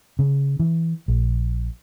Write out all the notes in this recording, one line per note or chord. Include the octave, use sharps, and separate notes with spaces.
C#3
E3
A#1